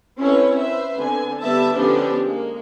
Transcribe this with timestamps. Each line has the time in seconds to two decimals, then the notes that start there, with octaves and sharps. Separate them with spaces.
0.18 C4 C#4 E4 A4 B4 C#5
0.60 B4 C5 E5
0.96 D3 B3 C4 G#5
1.40 D3 G3 B3 B4 E5 A5
1.76 D3 F3 B3 C#4 D4 G4
2.22 G#3 A#3